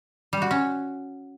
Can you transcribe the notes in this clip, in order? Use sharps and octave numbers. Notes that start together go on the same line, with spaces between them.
G3
F#4
C#4